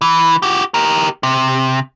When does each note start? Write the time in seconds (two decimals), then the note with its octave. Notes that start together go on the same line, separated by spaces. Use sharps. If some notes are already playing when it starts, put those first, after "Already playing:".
0.01 E3
0.42 F#4 G4
0.74 G4 A#4
1.23 C3